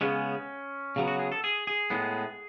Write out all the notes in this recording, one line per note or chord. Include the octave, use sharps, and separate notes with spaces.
C#3 G#3 B3 C#4
C#3 F#3 B3
F#4
G#4
A4
G#4
G#4
A2 G#3 B3